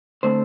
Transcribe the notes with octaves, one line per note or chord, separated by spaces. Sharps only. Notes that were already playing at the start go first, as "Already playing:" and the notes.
D3 A3 C4 C5